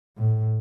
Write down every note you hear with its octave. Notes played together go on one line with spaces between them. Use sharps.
A2